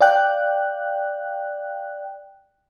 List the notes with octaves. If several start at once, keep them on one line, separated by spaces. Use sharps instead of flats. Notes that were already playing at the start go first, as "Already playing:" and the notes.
D5 F5 G5 F#6